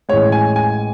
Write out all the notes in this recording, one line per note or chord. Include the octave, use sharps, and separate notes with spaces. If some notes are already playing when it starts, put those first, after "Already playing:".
A1 A2 G#3 C#5
G#5
G#5